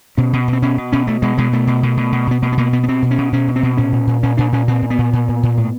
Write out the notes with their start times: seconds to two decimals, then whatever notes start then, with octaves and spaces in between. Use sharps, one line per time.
0.17 B2 C#4
0.33 B2
0.48 B2 C4
0.62 B2 C#4
0.78 B2
0.92 B2 C#4
1.07 B2 A3
1.22 B2 G#3
1.38 B2 G#3
1.53 B2 A3
1.67 B2
1.83 B2
1.97 B2
2.12 B2
2.27 B2 B3
2.42 B2 A#3
2.52 B3
2.57 B2 A#3
2.73 B2 B3
2.83 B3
2.88 B2 C4
3.02 B2
3.11 C#4
3.18 B2
3.32 B2 C#4
3.48 B2
3.56 C4
3.63 B2
3.77 A#2 C#4
3.92 A#2
4.07 A#2
4.23 A#2 C#4
4.37 A#2 D4
4.52 A#2 C#4
4.68 A#2 C4
4.82 A#2
4.90 B3
4.98 A#2
5.13 A#2
5.28 A#2
5.43 A#2
5.57 A2